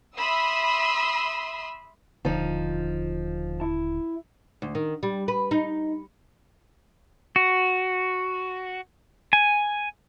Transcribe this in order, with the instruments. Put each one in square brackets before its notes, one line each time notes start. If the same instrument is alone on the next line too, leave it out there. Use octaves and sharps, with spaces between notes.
[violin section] E5 B5 C6 D#6 E6
[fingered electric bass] D#1 A#1 D3 [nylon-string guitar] F3 D#4
[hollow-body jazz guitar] E4 A5
[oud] D2
D#3
G3
B4
D#4
[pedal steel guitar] F#4
G#5